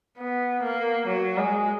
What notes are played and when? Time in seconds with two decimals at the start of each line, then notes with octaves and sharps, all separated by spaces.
0.19 B3
0.63 A#3
1.08 F#3
1.38 G#3